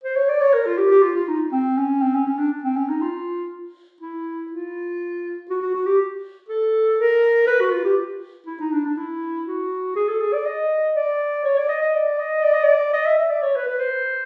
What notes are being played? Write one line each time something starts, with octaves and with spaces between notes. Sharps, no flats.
C5
C#5
D5
C#5
A#4
F4
G4
G4
F4
F4
D#4
C4
C#4
C4
C#4
C#4
D4
C4
C#4
D#4
F4
E4
F4
F#4
F#4
F#4
G4
A4
A#4
B4
F#4
F4
G4
E4
D#4
D4
D4
E4
F#4
G#4
A4
G#4
D5
D#5
D5
C#5
D5
D#5
D#5
D5
D#5
D5
D#5
D5
D#5
E5
E5
D5
C#5
B4
B4
C5